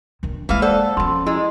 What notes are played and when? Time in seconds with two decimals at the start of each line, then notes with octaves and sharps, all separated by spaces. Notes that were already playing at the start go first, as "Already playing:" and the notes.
0.23 D#3 D4
0.49 E3 G#3 A#3 F5
0.62 A4 C5 D5 F#5
0.97 F3 C#4 B5 C6
1.27 G#3 E4 C6 E6